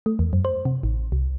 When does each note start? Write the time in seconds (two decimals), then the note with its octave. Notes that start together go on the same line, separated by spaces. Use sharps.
0.06 A3
0.19 E2
0.33 F#2
0.45 C5
0.65 C3
0.83 A1
1.12 C2